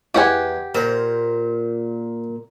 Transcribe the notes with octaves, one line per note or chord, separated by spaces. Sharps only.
E2 G4 F#5 G#5
A#2 A#4 C5